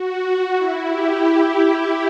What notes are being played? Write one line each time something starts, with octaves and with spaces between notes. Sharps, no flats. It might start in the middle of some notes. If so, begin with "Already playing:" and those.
Already playing: F#4
E4
G4